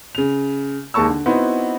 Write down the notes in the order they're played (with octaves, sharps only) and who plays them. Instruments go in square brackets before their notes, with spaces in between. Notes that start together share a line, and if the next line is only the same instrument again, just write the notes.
[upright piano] C#3 F7
D#2 G#3 A#3 A5 C#6 E6
D3
B3 C4 D#4 E4 F#4